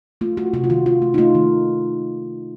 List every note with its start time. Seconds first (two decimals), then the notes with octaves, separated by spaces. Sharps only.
0.21 A3 F4
0.37 A3 F#4
0.53 C3 F#4
0.64 F4
0.70 D#3 F#4
0.86 D#3 F4
1.02 A3
1.14 D#4
1.18 A3 F4
1.35 D#3